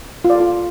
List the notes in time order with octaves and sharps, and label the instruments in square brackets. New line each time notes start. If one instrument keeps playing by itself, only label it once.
[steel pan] F4
D5
A4
F4